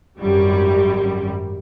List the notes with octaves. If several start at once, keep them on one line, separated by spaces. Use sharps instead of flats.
G#1 F#2 G3